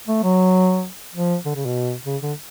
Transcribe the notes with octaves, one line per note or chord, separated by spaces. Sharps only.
A3
F#3
F3
D3
C#3
B2
C#3
D3